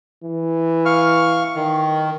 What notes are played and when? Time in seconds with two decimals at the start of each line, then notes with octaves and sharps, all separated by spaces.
0.24 E3
0.86 F5 C#6 F6
1.55 D#3